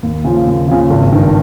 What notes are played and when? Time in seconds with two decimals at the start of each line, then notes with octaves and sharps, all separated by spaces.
0.03 D#2
0.24 C#3 F3
0.47 D#2
0.68 C#3 F3
0.90 G#1
1.12 G2 D#3